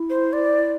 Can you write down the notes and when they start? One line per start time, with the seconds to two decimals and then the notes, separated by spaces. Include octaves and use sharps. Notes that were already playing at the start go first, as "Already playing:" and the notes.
Already playing: E4
0.10 C5
0.33 D5